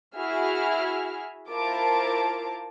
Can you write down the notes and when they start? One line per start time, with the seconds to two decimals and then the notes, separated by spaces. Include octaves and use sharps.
0.16 E4 F#4 G#4 E5 F6
1.50 E4 F4 A#4 C5 A5 D6